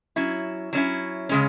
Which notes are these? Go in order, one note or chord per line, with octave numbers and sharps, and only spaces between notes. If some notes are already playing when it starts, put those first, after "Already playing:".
F#3 C#4 E4
F#3 C#4 E4
C#3 G#3 C#4